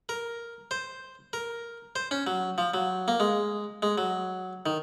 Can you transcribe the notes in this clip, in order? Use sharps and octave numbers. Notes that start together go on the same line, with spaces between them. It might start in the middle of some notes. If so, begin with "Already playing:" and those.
A#4
C5
A#4
C5
C#4
F#3
F3
F#3
A#3
G#3
G#3
F#3
D#3